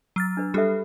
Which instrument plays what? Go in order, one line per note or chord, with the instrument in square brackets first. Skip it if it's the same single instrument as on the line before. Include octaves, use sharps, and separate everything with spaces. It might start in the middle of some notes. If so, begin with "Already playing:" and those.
[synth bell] F#3 F6 A6
[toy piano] D4 B4
[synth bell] G3 D4 [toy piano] G4 A4 E5